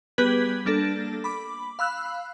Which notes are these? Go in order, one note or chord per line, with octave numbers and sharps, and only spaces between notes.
G3 B3 G4 G#4 B4 G#6
G3 A#3 D4 A4
B5 D6
F5 B5 E6 F#6